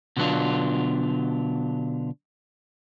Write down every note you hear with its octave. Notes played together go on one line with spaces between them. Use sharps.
B2 D3 F#3 B3 D4 F4